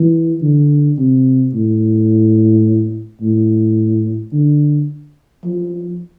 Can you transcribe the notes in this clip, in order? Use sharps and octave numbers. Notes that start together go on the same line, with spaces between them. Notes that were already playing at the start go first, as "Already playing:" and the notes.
Already playing: E3
D3
C3
A2
A2
D3
F3